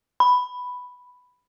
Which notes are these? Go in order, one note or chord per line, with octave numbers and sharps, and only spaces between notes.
B5